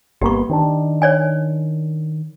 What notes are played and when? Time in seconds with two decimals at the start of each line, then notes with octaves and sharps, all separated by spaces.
0.22 G1 A#3 B3 G4 C#6
0.49 D#3 C4 D4
1.02 C#5 D5 G#5